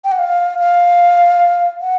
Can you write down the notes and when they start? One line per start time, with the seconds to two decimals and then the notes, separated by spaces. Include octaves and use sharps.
0.04 G5
0.12 F#5
0.19 F5
0.59 F5
1.81 F#5